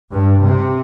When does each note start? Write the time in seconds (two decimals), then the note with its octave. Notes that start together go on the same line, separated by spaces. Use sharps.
0.11 G2
0.44 C3